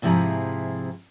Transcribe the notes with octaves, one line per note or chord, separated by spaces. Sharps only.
G#2 C3 F3 E4 G#4 A#5